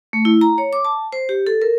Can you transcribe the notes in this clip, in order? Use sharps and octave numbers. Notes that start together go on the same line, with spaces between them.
A3
E4
A#5
C#5
D6
A5
C5
G4
A4
A#4